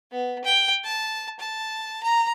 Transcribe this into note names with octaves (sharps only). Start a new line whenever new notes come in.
B3
G5
A5
A5
A#5